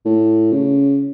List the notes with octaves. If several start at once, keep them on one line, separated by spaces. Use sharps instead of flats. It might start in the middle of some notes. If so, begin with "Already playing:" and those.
A2
C#3